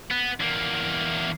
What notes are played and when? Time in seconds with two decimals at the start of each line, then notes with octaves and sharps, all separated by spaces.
0.11 B3
0.40 E2 A#3